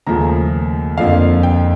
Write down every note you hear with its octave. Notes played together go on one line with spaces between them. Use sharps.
D#2 C#3 F3 A3 A#5
F2 D3 F3 A#3 F5
G5